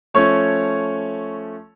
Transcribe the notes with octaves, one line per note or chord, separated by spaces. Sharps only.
F3 A3 C#4 C#5